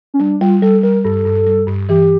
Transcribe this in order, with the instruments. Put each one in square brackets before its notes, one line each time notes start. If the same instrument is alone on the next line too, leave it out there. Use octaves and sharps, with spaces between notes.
[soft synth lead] C#4
[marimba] G3 [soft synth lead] D4
[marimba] G3 [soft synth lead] F4
[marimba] G3 [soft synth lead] A4
[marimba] G3 [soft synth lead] A#4
[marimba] G2 [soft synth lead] A4
[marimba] G2
G3
G2
[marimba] E3 [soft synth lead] G4